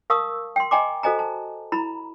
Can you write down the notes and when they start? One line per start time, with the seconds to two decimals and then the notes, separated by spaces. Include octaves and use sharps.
0.10 A#4 F5 A5 C#6 D#6 E6
0.56 G5 C6
0.71 D#5 G5 G#5 A#5 C6 D6
1.03 F#4 A4 C5 D#5 G#5 A#5
1.19 A5
1.72 E4 A#5 B5